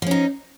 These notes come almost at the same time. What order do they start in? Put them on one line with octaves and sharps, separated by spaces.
F3 C#4 D#4